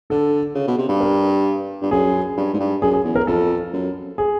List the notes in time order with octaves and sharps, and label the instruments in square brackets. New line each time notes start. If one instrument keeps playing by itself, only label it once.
[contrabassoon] D3 [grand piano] A4
[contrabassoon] C#3
B2
C3
G2
[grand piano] A#4
[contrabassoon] G2
[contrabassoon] F#2 [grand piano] G#4
[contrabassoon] G2
G#2
G2
[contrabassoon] F#2 [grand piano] G#4
[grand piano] G#4
[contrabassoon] E2
[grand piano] A#4
[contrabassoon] F2 [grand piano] A4
[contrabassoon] F#2
[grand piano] G#4